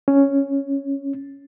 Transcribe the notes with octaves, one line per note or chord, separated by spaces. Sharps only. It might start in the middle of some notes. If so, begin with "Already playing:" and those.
C#4